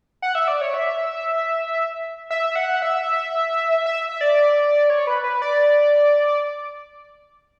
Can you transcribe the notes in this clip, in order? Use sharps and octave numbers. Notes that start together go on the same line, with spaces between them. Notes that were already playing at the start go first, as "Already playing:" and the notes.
F#5
E5
D5
C#5
E5
E5
F#5
E5
E5
E5
D5
C#5
B4
B4
D5